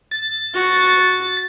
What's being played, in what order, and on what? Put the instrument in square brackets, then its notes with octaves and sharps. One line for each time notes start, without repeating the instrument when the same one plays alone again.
[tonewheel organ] A6
[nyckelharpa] F#4